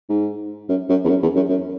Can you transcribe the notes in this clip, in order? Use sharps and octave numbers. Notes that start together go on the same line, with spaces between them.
G#2
F#2
F#2
E2
F#2
E2
F#2
F#2